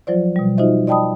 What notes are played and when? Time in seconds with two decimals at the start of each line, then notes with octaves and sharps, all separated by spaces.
0.07 F3 F#3 F4 C5 D5
0.36 B2 G3
0.57 D#4 F4 F#4 C5 D#5 E5
0.87 D5 D#5 G5 A5 B5 D#6